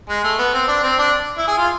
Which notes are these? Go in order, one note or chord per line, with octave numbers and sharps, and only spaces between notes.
G#3
A3
B3
C4
D4
C4
D4
E4
G#4
F4